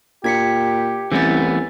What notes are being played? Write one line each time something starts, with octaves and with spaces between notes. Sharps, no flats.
A#2 G4 G#6 B6 C#7
C2 E3 A3 B3 C#4 A6